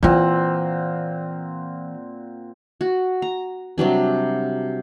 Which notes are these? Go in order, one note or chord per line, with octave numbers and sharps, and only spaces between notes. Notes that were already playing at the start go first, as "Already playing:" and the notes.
A#2 E3 C4 F4 F#5
F#4
A#5
C3 F#3 G3 D4